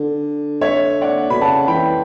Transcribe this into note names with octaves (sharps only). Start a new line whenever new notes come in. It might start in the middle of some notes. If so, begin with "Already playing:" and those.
Already playing: D3
C#5 E5
D5 F#5
B2 B5
C#3 F#5 A5
E3 G5 B5